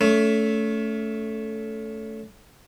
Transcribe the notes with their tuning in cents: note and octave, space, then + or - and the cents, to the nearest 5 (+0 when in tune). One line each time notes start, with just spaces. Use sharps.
A3 +0 C#4 +30